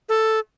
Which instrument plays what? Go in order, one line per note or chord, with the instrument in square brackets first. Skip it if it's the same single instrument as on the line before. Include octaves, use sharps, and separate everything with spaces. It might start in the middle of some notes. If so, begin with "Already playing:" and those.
[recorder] A4